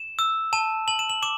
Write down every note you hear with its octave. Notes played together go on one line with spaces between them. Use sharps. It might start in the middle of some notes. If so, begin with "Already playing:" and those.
Already playing: E7
E6
A5 E7
A5 F#7
E7
F#7
D6 E7